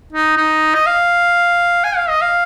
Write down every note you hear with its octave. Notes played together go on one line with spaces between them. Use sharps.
D#4
D#4
D#5
F5
G#5
F5
D#5
F5